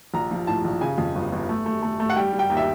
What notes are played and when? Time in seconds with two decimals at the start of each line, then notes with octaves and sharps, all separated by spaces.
0.14 A#1 A#5
0.31 F3
0.47 A2 A5
0.65 A#1
0.81 C#3 G#5
0.98 F2
1.15 G1
1.32 G1
1.49 A3
1.66 A3
1.82 A3
2.00 A3
2.10 F#5
2.16 G3 G5
2.33 G3
2.39 G5
2.50 D#2
2.57 E5